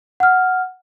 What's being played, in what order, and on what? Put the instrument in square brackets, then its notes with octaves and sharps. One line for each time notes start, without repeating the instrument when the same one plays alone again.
[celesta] F#5 F6